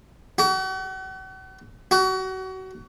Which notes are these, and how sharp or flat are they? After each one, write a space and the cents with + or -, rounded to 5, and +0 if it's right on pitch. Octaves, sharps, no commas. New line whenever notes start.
F#4 +40
F#4 +30